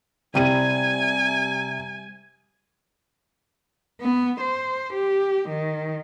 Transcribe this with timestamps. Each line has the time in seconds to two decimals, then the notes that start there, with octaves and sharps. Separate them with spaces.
0.35 C3 G3 C4 E4 G#5 D#7
4.01 B3
4.40 C5
4.93 G4
5.48 D#3